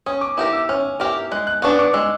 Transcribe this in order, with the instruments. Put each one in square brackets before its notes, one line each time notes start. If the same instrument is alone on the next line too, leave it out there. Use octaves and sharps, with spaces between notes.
[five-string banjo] C#4 [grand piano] D#6
[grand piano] D6
[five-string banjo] E4 G4 A#4 [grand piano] D#6
[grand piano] E6
[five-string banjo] C#4 [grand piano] F6
[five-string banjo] E4 G4 A#4 [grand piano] F6
[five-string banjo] G#3 [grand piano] F#6
[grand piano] F#6
[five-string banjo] B3 D4 [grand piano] C#6
[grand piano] D6
[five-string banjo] G#3 [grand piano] E6